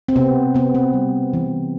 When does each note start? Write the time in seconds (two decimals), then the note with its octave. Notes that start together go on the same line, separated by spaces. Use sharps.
0.08 C4
0.16 C3 B3
0.54 C3 B3
0.75 C4
0.93 G3
1.33 E3